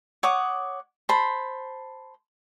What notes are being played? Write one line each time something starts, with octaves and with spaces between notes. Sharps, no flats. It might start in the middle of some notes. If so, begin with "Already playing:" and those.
C#5 F#5 D6 D#6
C5 A5 B5